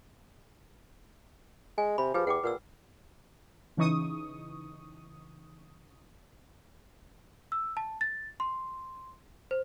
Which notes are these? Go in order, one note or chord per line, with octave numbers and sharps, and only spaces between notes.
G#3 G#5
C3 B5
F3 G4 G#4 B4
E2 F#5 G5 D6
A#2 B4 F#5 E6
C#3 E3 D#4 C#6 D#6
E6
A5
A6
C6
C5